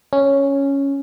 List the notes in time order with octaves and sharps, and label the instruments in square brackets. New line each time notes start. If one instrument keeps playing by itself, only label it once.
[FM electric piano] C#4